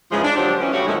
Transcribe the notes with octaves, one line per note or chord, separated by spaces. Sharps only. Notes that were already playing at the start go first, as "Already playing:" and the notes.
G#2 C#3 E3 F3 G#3
D4
D3 F3 F#3 D4 G4 C5
E3 B3 C#4
C#3 G3 A3 C#4 D4 F#4
B2 D3 D#3 F3 G#3 A3